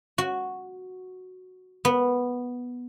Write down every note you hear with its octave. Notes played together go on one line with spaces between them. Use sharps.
F#4
B3